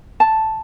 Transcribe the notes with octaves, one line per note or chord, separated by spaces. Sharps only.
A5